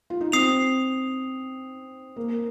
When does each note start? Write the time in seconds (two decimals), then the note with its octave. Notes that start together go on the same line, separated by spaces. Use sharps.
0.10 F4
0.21 D#4
0.32 C4 D#6 C7 F7
2.16 A#3